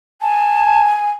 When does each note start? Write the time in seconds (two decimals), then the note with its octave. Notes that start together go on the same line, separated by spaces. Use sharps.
0.22 G#5 A5